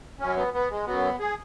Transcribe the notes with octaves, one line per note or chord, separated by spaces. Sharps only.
F#2 F#3 C#4
B3
B3
G#3
F#2 F#3 B3
G#4